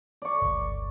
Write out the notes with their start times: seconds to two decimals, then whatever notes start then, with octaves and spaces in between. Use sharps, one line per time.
0.22 D5 C#6
0.41 G1 C#2